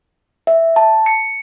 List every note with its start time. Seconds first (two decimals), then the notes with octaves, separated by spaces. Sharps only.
0.47 E5
0.76 A5
1.06 C#7